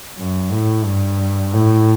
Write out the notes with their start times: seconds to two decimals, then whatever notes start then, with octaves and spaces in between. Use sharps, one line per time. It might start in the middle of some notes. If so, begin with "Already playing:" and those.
0.18 F#2
0.52 A2
0.85 G2
1.53 A2